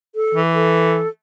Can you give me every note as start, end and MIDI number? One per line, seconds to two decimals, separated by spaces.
0.15 0.41 69
0.35 1.04 52
0.54 1.08 69